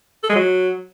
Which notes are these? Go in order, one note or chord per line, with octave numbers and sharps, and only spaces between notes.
A4
G#3
F#3